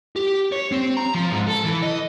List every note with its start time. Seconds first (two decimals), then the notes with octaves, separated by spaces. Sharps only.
0.16 G4
0.52 C#5
0.72 C4
0.97 A#5
1.14 F3
1.31 G#2
1.48 A4
1.65 E3
1.83 D#5